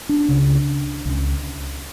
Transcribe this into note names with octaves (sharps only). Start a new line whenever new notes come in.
D4
C#2 C#3
C#2 C#3